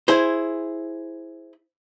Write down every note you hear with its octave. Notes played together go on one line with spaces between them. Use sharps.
E4 G#4 C5